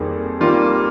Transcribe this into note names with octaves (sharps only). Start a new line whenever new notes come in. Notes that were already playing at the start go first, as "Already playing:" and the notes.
Already playing: F2 D#3 G3 A#3 G#4
D#3 G3 A#3 F4